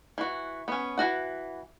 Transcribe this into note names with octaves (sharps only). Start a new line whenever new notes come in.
E3 F#4
B3 C#4
E3 F#4 F#5